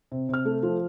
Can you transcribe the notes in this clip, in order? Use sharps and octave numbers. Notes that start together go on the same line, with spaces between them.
C3
C3 F6
A3
F3